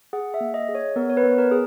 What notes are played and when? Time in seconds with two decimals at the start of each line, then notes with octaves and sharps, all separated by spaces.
0.13 G#4 F#5
0.34 E5
0.41 A#3
0.54 D#5
0.68 G#4
0.75 C#5
0.96 B3 A#4
1.09 C#5
1.17 B4
1.23 B3
1.38 A#4
1.52 G#4